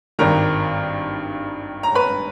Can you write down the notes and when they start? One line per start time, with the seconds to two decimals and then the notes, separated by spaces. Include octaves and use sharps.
0.19 G#1 G2 D#3 A#4 A#5
1.83 A#5
1.95 B4 B5